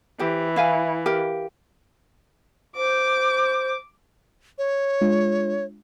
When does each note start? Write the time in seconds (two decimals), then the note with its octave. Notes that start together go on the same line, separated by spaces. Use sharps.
0.19 E3 G4 C5
0.56 E4 F5 G#5
1.06 G4 A#4 F5
2.76 C5 D6
4.58 C#5
5.01 G#3 D4 F4